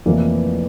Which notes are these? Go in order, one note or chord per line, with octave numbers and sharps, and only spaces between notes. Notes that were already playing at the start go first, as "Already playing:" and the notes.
F1 F2 E3 A#3 E4